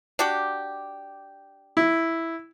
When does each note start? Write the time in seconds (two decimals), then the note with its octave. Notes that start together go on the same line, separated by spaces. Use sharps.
0.19 D4 F#4 G4
1.77 E4